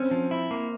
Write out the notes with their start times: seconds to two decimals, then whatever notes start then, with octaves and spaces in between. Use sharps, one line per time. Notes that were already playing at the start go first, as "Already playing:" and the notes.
Already playing: C4 C#4
0.11 F3
0.31 E4
0.51 A#3